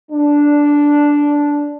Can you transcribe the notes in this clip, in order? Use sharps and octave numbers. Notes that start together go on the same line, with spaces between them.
D4